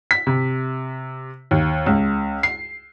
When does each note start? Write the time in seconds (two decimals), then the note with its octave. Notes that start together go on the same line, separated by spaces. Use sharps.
0.11 B6
0.27 C3
1.51 D#2
1.86 C#2
2.43 C7